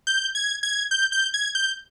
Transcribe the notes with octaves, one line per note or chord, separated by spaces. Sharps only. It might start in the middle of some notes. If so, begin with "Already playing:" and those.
G6
G#6
G#6
G6
G6
G#6
G6